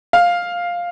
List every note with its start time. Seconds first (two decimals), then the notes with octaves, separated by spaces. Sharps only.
0.13 F5